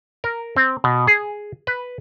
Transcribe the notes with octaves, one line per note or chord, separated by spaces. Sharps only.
A#4
C4
B2
G#4
B4